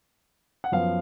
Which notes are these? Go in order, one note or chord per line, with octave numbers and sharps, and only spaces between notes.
F#5
F#2 F3 B3 F5